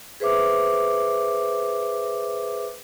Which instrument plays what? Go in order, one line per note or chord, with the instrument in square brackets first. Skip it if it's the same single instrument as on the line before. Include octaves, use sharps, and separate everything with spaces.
[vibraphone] G#4 B4 C5 E5 D6